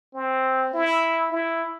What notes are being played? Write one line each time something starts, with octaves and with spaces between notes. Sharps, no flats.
C4
E4
E4